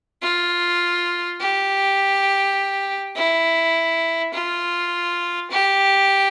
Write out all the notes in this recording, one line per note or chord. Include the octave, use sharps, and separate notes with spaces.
F4
G4
E4
F4
G4